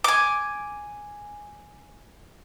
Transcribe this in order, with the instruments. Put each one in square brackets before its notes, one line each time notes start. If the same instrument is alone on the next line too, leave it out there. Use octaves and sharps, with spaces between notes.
[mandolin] G#5 D6